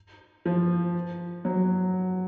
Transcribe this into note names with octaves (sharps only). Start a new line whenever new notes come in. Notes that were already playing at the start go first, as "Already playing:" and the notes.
F3
F#3